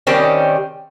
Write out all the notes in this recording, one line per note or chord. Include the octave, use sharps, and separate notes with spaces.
D#3 G3 C4 C#4